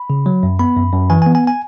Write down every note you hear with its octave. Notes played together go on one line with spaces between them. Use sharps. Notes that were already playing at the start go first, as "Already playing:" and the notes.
Already playing: B5
C#3
F#3
F#2
B3 B5
F#2
F#2
E3 G#5
G#5
B3
G#5
G#5